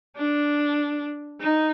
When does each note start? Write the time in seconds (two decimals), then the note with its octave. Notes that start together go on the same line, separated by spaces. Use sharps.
0.17 D4
1.41 D#4